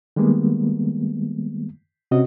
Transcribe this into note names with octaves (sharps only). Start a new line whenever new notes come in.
D#3 G3 G#3 A#3 B3
C3 C4 C#4 F#4 D#5